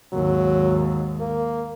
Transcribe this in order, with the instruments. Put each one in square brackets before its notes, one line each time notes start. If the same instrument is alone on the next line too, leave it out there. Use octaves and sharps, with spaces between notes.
[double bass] D#2 G#2 [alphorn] F#3
[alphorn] A#3